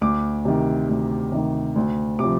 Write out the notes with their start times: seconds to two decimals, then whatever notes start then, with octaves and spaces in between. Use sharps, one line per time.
0.01 D2 D6
0.45 C3 D#3
0.89 D2
1.32 C3 D#3
1.76 D2
2.19 C3 F3 D6